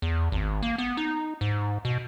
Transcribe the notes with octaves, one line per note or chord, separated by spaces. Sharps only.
E2
G#1
A#3
B3
D#4
G#2
B2